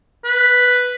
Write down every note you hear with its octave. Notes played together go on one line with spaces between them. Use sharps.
B4